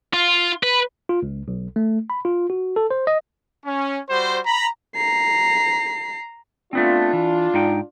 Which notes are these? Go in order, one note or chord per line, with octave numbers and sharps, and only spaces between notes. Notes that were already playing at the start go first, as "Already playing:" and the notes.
F4
B4
F4
C#2
B1
A3
B5
F4
F#4
A4
C5
D#5
C#4
G3 F#4 C5
A#5 B5
A#5 C7
A3 B3 C4 D4 F4
E3
G#2 D#4 G5